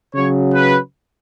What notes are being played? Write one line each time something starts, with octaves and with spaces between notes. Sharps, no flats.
C#3 F#3 C#5
B4